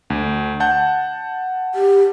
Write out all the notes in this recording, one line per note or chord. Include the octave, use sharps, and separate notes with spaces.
D2
F#5 A5 G6
G4